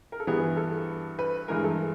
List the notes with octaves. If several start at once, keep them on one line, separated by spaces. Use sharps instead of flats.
A#4
A4
G2 E3 G3 B3 G#4
A4
B4
G2 E3 G#3 A#4
A4